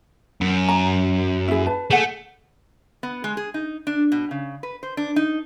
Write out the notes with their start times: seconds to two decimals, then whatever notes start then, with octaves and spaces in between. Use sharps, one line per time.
0.41 F#2
0.69 A#5
1.48 E4 G#4
1.66 B4 A5
1.91 A3 G#4 F#5
3.03 B3
3.24 G#3
3.37 G#4
3.54 D#4
3.87 D4
4.12 B2
4.31 C#3
4.63 B4
4.83 C5
4.97 D4
5.16 D#4